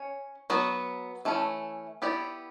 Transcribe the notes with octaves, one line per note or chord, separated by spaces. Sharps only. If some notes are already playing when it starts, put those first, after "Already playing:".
Already playing: C#4 C#5
F#3 B3 F#4 B4
E3 A3 C#4
B3 E4 G4 D5